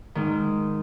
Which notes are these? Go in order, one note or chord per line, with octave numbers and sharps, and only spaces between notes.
G#2 D#3